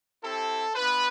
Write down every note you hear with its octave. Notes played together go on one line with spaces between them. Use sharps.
C4 E4 G4 A4
B3 D4 F4 B4